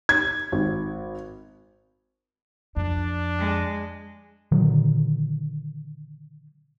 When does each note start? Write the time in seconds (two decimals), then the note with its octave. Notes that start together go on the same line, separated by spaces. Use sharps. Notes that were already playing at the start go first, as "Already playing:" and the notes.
0.09 G#6
0.52 G#1
2.77 F2 D4
3.38 G#3
4.52 A#2 D3 D#3 F#3